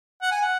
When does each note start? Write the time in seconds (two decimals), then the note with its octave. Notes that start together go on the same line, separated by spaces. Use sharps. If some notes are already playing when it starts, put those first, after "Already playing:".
0.22 F#5
0.31 G#5
0.42 F#5